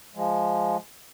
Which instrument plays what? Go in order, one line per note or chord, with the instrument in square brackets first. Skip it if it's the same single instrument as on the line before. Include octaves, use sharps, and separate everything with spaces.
[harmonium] F3 G#3